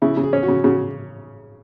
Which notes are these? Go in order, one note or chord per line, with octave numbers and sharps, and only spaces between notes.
C#3 E4
C#3
G#4
C#4
F#4
C#3
C#3 F#4